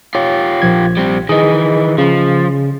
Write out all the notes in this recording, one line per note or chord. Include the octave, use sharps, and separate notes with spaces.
F4 G4 C#5
A#1 F3 G#6
G3 C4
D#3 E3 G#4 D#5
C#3 F3